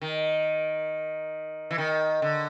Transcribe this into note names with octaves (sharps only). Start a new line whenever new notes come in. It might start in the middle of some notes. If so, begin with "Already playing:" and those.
D#3
E3
D#3
D3